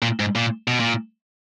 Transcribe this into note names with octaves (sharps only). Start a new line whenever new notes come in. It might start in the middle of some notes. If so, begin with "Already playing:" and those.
A#2
G#2
A#2
B2
A#2